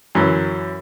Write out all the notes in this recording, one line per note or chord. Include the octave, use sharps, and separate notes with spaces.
F#2 E3 F#3 C#4